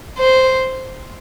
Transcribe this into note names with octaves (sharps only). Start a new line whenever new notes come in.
C5